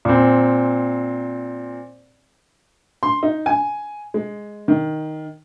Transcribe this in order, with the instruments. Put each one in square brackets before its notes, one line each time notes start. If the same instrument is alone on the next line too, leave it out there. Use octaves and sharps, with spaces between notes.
[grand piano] A#2 C4
[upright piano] C6
D#4
G#5
G#3
D#3